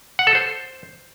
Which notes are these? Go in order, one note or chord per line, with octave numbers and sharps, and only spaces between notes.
F#5
A4
C5